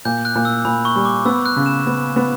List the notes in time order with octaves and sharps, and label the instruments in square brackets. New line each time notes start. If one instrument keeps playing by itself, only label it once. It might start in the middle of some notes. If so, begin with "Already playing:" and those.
[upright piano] A#2 [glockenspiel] G6
[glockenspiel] F#6
[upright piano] A#2
[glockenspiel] E6
[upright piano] A#2 [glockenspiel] B5
[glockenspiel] C#6
[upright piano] G3
[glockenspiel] D6
[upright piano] B3 [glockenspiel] E6
[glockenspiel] F#6
[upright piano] C#3
[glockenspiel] E7
[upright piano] B3
B3